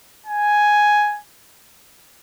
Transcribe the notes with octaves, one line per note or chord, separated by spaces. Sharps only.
G#5